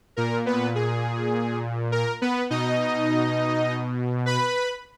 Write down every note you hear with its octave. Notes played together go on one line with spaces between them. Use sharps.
A#2 A#4
B3 B4
G#4
A#4
B3 B4
B2 D#4 D#5
B4 B5